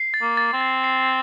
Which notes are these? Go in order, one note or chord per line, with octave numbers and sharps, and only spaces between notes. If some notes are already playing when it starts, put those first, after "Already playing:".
Already playing: C7
A6
A#3
A6
C4
A6
C7